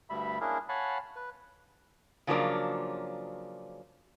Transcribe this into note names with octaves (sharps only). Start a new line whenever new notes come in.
D2 G2 G3 E5 B5
A#3 C#4 D4 E4 G#4 A#4
C#5 F5 F#5 G#5 A5 B5
B4
C#3 F3 F#3 A#3 D4